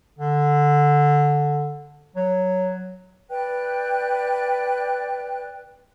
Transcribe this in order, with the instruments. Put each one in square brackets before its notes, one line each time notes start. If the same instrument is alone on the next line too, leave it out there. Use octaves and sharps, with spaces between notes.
[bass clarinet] D3
F#3
[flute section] B4 D5 G5 F#6